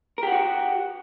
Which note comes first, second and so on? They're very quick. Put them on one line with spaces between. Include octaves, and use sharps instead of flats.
A#4 G4 F#5 F#4